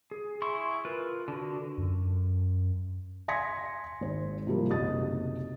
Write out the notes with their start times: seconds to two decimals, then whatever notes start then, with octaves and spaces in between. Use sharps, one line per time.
0.11 G#4
0.42 E4 G#4 C6 C#6
0.85 F4 A#4 B4
1.28 D3 F#4
1.78 F#2
3.28 G#5 C6 G#6 A#6 B6 C#7
4.01 G#1 C5
4.47 C3 F3 G3 A#3
4.68 F#1 B1 C3 D#5 D#6 A6